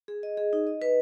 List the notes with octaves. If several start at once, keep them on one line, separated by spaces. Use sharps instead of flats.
G#4
D#5
G#4
D#4
D#5
B4